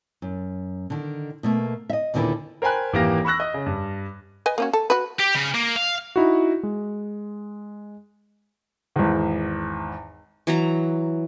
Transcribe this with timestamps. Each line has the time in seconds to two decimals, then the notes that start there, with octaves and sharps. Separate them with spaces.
0.22 F#2
0.90 D3 D#3
1.43 B2 A3 A#3
1.90 D#5 E5
2.14 D#2 A#2 D3 D#3 E4 B4
2.62 A#4 C5 G5 G#5 B5 F#6
2.93 G#1 E3 A#3 G4 F5 A#6
3.25 B5 C#6 E6 F#6 A#6
3.40 D#5
3.54 C#3
3.66 G2
4.46 B4 D#5 G#5
4.58 A#3 C#4 F#4
4.73 A4
4.90 F#4 B4
5.19 G4
5.35 C#3
5.54 A#3
5.76 F5
6.16 D#4 E4 F#4
6.63 G#3
8.96 G#1 E2
10.47 E3 F#3 A#5